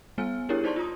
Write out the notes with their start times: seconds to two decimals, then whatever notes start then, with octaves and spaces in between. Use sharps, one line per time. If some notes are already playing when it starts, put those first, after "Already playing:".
0.18 G3 B3 G#5 F6
0.49 D4 E4 G4 G#4 A#4 C#5
0.64 D#4 C5 D5 A5 C6 C#6
0.76 F4 A#5 D#6